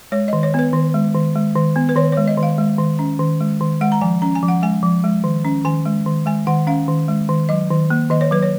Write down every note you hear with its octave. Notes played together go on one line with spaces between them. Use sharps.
G#3 C#5
D#3 D#5
C#5
B3 B4
D#3
G#3
D#3
G#3
D#3
B3
B4
D#3 C#5
G#3 C#5
D#5
D#3
F5
G#3
D#3
C#4
D#3
G#3
D#3
G#3 F#5
A#5
F3 G#5
C#4 A#5
G#5
F3
F#5
G#3 G#5
F3
G#3
D#3
C#4
D#3 G#5
G#3
D#3
G#3 G#5
D#3 F#5
C#4 F5
D#3
G#3
D#3
F#3 D#5
D#3
A#3
D#3 D#5
C#5
F#3 B4
C#5